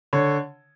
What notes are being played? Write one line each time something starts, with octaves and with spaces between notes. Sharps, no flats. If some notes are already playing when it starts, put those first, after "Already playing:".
D3 C#5